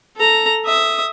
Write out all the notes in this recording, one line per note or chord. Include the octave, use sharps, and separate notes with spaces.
A4 A#5
E5 D#6